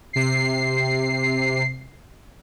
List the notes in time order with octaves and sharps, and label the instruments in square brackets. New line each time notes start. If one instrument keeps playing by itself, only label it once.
[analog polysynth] C3 C7